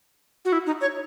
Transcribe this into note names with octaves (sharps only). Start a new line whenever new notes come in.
F#4
E4
D#4
C#5